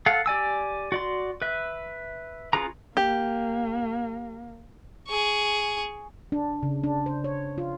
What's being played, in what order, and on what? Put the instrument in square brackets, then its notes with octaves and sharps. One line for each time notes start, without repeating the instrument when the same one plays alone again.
[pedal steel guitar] A4 F5 F#5
G4 D5 G#5 E6
F#4 D5 C6
B4 E5
C#4 F4 G#4 B4 A#5
[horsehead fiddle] A#3 [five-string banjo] G4
[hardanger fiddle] G#4 C#6
[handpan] D4
C#3
D4
C5
C#5
F4